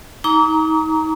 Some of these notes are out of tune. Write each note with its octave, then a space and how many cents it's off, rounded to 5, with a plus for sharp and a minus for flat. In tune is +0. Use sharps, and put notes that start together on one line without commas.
D#4 +35 A#5 +0 D6 -35